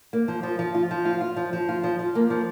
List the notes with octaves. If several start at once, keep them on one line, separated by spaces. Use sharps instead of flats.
A#3
F3
F3
F3
F4
F3
F4
F4
F3
F3
F4
F3
F3
A#3
F3